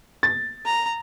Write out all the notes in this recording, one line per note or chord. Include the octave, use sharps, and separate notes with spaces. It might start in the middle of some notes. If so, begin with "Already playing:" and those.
A6
A#5